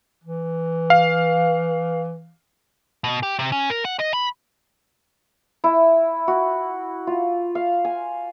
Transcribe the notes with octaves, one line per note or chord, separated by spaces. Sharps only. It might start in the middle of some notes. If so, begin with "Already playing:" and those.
E3
F5
B2
G4
C3
C#4
A#4
F#5
D#5
B5
E4
F#4
F4
F5
G#5